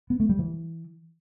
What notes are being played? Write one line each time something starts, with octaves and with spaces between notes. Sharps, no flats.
B3
A3
G3
E3